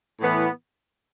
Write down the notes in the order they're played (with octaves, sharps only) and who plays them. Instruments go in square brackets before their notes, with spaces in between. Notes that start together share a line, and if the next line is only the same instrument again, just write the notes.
[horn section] A2 E3 B3